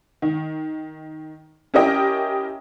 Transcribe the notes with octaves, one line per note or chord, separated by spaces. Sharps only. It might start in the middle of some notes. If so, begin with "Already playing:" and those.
D#3
C#4 E4 G4 A#4 D#5 G5